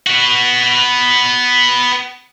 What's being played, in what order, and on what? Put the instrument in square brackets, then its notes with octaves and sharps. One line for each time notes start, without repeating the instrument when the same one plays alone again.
[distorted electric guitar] B3 F#4